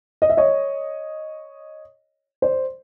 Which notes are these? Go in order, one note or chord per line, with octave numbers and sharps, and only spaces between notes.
D#5
E5
C#5 D#5
C5 D5